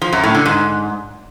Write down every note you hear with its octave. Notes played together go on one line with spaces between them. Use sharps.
F3
F#2
A2
D3
G#2